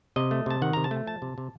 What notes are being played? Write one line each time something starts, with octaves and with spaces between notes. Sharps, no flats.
C3 D#5
A3
C3 A5
D#3 F#5
C3 A#5
A5
A3
F3 A5
C3
C3